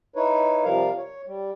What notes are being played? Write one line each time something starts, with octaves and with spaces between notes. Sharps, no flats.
D#4 E4 B4 C#5
C3 F3 G3 A#4 F5
C#5
G3